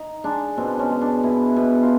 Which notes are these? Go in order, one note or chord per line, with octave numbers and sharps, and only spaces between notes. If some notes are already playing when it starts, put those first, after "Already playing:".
Already playing: D#4
G#3 D4
B2 C4
C#4
G#3
D4
B2 E4
B2
F4